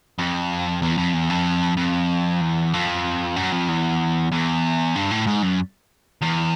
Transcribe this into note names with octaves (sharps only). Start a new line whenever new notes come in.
F2
E2
F2
E2
F2
F2
E2
F2
F#2
F2
E2
E2
G2
A2
G#2
F#2
E2